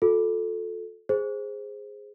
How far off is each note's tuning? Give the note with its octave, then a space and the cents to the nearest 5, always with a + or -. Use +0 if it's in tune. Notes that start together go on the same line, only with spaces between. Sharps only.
F4 +45 A4 -5
G#4 -5 C5 +0